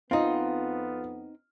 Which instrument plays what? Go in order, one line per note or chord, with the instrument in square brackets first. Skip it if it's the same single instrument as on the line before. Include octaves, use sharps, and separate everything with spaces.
[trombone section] F2 B3 [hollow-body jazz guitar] C4 D#4 [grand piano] F4